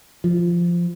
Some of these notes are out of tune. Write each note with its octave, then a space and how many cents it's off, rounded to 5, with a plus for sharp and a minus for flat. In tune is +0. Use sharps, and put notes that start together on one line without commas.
F3 -10